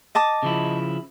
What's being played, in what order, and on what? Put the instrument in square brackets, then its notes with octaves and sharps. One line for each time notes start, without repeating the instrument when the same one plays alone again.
[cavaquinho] D#5 A5 D6
[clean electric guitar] C#3 F3 E4